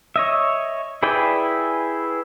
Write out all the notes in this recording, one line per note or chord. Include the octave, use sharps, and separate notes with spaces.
C#5 D#5 E5
E4 G#4 B4 D5 G5